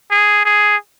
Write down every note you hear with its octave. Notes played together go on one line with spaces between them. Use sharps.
G#4
G#4